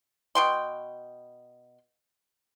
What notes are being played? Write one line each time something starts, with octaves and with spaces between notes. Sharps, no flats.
B2 G5 C6